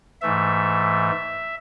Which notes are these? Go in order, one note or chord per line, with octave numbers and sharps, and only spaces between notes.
G#2 E3 A3 E5